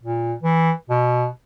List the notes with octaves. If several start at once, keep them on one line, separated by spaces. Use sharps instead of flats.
A#2
E3
B2